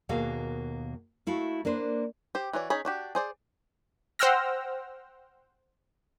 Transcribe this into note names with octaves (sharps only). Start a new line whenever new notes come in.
D#2 B2 A#3 F#4 G#4 F5
A3 E4 F#4 F5
A#3 D4 B4 C5
G4 C5
E3 F#4 C#5 D5
C#4 D#4 G#4 C#5 B5
D4 F#4 G4
G#4 C5 D5
C5 F#5 G5 E6 F6 A#6